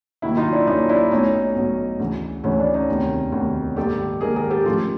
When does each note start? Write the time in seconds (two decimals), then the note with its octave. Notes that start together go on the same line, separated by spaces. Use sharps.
0.22 D#2 D#3 F#3 A#3 E4 F#4
0.37 D#4 F4
0.52 D4 E4
0.67 D#2 D#3 F#3 A#3 C#4 D#4
0.89 D4 E4
1.11 B1 A2 F#3 C#4 D#4
1.56 B1 A2 F#3
1.99 D2 C#3 E3
2.44 D2 C#3 E3 C#4
2.59 D4
2.73 C#4 D#4
2.89 E1 D2 C3 D#3
3.32 E1 D2 C3 D#3
3.76 A#1 G#2 D#3 G4 A4
4.21 A#1 G#2 D#3 G#4 A#4
4.36 G#4 A#4
4.50 G4 A4
4.65 A1 A2 F3 G#3 F4 G4